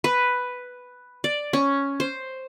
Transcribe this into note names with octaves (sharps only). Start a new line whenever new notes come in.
B4
D5
C#4
C5